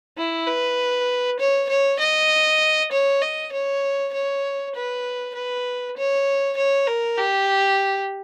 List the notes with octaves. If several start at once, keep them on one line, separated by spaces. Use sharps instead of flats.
E4
B4
C#5
C#5
D#5
C#5
D#5
C#5
C#5
B4
B4
C#5
C#5
A#4
G4